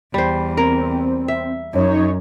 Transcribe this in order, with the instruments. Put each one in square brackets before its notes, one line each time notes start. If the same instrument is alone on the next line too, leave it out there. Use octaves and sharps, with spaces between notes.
[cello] E2 [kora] G3 C5
[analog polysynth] C4 [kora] A#4
[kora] E5
[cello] F#2 [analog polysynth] D#4 C#5